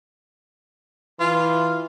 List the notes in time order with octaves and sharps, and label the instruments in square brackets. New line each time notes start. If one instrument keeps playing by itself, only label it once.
[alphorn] E3 [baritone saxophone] F4